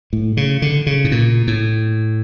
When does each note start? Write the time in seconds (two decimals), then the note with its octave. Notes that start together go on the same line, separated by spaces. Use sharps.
0.13 A2
0.37 C#3
0.62 D3
0.87 C#3
1.04 A2
1.12 A#2
1.47 A2